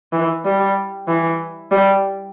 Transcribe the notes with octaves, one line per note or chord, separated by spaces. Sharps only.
E3
G3
E3
G3